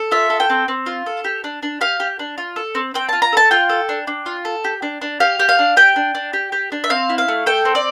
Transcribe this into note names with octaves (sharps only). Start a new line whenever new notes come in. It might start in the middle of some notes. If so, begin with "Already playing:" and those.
Already playing: A4
F4 E5
A4
G5
C4
C4
F4
A4
G4
D4
D4
G4 F5
G4
D4
F4
A4
C4
C4 G5
F4 A5
A#5
A4 A5
F4 G5
A4
D4
D4
F4
A4
G4
D4
D4
G4 F5
G4
F5
D4
G4 G5
D4
D4
G4
G4
D4
E5
C4 F5
E4
F5
A3
A4 G5
C4
D5